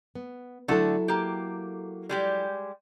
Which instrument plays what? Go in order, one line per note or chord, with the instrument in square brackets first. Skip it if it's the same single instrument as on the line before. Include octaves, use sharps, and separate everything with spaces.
[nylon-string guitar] B3
[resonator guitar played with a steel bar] D3 A3 F#5 [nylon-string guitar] F#3 E4 A4
[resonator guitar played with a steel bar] A#3 G4
G3 G#3 G4